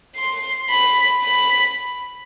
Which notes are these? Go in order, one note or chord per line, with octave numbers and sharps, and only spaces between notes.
C6
B5
B5